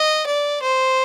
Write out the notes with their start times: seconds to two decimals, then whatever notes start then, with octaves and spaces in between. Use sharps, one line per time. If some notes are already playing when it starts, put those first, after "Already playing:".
Already playing: D#5
0.26 D5
0.62 C5